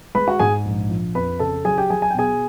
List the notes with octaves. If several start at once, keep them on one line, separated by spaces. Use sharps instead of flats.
G#3 B4 B5
F#4 F#5
G#2 G#4 G#5
A#1
F3
F2 B4 B5
C#3 A4 A5
F#3 G#4 G#5
G4 G5
F#3 G#4 G#5
G#5
G5
B2 G#4 G#5